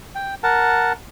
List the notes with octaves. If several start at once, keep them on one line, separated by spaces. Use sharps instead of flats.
G5
A#4 F#5 A5